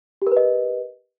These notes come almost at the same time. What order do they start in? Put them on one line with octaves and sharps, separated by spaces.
G4 A#4 B4 D#5